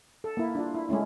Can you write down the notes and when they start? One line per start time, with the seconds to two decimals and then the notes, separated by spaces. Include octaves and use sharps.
0.24 A4
0.37 A#3 E4
0.55 D4 F4
0.75 E4
0.89 G#3 A3 C#4 E4